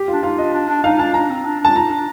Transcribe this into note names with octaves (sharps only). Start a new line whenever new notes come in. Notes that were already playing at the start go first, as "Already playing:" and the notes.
Already playing: G4
D4 F4
D#4 F4
D4 D#5
D4
D4
D#4 F5
D4 A5
D4 A#5
C4
D4
D4 A5
D#4 A#5
D4